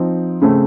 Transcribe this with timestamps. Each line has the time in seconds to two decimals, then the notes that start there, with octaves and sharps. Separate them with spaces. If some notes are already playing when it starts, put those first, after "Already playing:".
Already playing: F3 C4 D#4
0.42 C#3 A3 C4